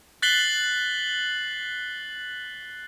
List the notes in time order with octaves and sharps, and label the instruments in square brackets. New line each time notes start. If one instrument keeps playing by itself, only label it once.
[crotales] F#6 A6 B6 C7 F#7 G7